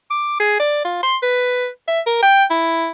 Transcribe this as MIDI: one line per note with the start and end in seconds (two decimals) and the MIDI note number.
0.10 0.38 86
0.40 0.59 68
0.60 0.84 74
0.85 0.98 65
1.03 1.17 84
1.23 1.68 71
1.88 2.00 76
2.06 2.18 70
2.22 2.44 79
2.50 2.91 64